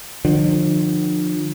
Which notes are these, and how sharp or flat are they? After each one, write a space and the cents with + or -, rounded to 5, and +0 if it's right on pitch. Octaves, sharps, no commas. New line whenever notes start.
D3 +45 F3 +20